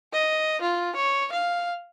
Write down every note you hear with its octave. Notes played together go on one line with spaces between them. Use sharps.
D#5
F4
C#5
F5